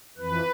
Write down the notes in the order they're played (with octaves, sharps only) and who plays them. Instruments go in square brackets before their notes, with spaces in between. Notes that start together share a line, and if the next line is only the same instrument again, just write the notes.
[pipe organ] F2 E3 B4